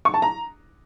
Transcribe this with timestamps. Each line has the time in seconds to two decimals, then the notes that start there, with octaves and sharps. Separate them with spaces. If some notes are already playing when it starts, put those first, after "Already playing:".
0.05 C#6
0.14 A5
0.22 A#5